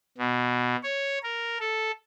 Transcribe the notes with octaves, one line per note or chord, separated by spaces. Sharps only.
B2
C#5
A#4
A4